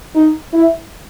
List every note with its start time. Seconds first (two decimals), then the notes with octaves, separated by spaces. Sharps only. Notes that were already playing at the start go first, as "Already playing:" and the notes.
0.15 D#4
0.53 E4